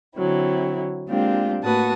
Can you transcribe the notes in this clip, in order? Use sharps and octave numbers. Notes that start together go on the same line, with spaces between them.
D3 F#3 C4 E4
G#3 A#3 C4 D4 F4 G4
A2 A#3 F#4 B4 A5 D#6